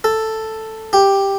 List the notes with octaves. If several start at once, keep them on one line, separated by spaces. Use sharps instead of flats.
A4
G4